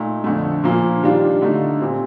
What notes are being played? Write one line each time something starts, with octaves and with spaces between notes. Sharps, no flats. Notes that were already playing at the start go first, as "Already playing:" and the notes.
Already playing: A#2 A3 D#4
F2 D3 A3
A#2 F3 A#3 F4
D#3 G3 D4 F4
D3 A3 D#4
A#2 G3 C4